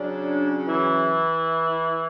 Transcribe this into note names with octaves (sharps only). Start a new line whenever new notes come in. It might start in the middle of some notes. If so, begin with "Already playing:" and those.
Already playing: C#3 F#3 C#4 D4
E3 E4